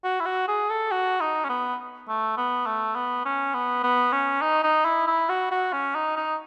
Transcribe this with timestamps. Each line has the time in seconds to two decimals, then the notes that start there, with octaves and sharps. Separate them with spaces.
0.04 F#4
0.20 E4
0.26 F#4
0.48 G#4
0.70 A4
0.91 F#4
1.21 D#4
1.44 C#4
1.49 B3
2.08 A3
2.37 B3
2.66 A3
2.95 B3
3.25 C#4
3.54 B3
3.83 B3
4.12 C#4
4.42 D#4
4.63 D#4
4.85 E4
5.07 E4
5.29 F#4
5.51 F#4
5.73 C#4
5.95 D#4
6.16 D#4